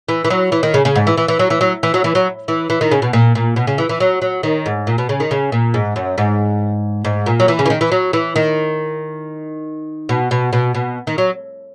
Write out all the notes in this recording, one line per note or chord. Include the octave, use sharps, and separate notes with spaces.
E3
E3
F#3
E3
D#3
C#3
C#3
G#2
E3
E3
E3
F#3
E3
F#3
E3
F#3
E3
F#3
E3
E3
D#3
C#3
B2
A#2
A#2
B2
C#3
E3
E3
F#3
F#3
D#3
G#2
A#2
B2
C#3
D#3
C#3
A#2
G#2
F#2
G#2
G#2
A#2
F#3
E3
C#3
E3
D#3
E3
F#3
E3
D#3
B2
B2
B2
B2
D#3
F#3